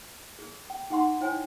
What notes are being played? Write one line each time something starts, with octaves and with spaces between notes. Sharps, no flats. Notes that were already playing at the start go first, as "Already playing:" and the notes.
G#4
G5
D#4 G#4 F#5 C6 C#6
E4 C5 C#5 G5 G#5